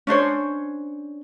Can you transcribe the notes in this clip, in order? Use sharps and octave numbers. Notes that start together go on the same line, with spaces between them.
C#4 D4 C5 C#5